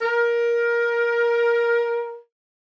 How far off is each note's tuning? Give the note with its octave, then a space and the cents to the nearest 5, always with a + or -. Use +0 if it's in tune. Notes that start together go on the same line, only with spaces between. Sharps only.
A#4 +15